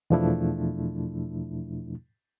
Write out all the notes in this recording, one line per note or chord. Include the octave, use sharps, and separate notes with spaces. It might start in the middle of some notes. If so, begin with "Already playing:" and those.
E2 B2 F3 A3 D4 E4